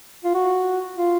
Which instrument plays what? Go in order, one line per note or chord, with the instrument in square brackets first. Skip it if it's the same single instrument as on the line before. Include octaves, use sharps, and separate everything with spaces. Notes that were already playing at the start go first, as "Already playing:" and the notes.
[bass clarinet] F4
F#4
F4